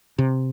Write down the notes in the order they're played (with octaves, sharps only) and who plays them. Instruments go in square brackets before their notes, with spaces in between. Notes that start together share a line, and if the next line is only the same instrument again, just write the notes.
[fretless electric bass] C3